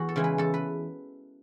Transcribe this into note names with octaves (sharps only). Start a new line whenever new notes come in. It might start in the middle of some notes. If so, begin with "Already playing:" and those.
Already playing: E2 F#4
A4
C#3 E3 G#3
B4
E2 A4
B4